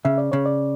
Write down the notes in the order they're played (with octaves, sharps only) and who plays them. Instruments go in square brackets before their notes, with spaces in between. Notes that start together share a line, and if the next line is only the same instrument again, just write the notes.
[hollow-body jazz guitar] C#3 [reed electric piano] E5
[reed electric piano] D5
[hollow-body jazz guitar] C#3 [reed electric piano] C#5
[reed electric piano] D5